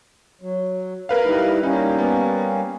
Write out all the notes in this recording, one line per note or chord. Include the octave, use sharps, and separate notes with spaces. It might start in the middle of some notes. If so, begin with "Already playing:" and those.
F#3
A#3 A#4 B4 F5
G3 D#4 E4
G3 A#3 C#4 D#4
B3